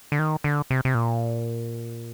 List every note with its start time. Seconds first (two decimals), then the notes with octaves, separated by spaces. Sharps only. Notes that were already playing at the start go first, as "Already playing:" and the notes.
0.12 D3
0.19 D#3
0.44 D3
0.70 C3
0.85 C3
0.95 A#2